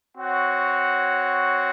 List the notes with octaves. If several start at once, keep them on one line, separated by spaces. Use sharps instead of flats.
C4 F#4 C#5 F#5